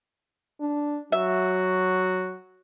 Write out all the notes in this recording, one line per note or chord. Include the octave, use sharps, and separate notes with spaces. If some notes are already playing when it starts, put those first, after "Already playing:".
D4
F#3 F#4 E5